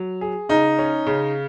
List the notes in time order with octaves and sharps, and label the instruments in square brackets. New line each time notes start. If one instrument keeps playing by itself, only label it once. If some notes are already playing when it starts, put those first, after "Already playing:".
Already playing: [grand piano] F#3
G#4
[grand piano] C#3 [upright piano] D#4
[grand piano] C#4
C#3